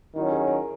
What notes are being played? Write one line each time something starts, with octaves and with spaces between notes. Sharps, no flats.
D#3 F#3 C#4 E4
G#4
A#4